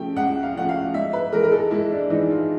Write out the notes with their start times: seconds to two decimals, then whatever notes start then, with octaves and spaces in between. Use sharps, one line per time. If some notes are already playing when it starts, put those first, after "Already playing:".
Already playing: C#3 F3 A3 G5
0.16 C#2 F#5
0.43 F5
0.55 C#3 F3 A3 F#5
0.69 F5
0.94 G#2 E5
1.13 B4
1.32 E3 G#3 A#4
1.43 A#4
1.52 A4
1.71 G#2 E4
1.91 D4
2.10 E3 G#3 D#4
2.30 F4